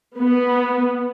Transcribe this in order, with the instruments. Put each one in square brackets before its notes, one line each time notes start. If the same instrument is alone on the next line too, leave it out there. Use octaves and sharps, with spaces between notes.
[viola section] B3